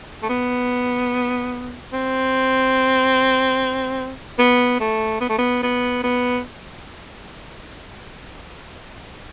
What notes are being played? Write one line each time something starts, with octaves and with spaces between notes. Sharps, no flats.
A3
B3
C4
B3
A3
B3
A3
B3
B3
B3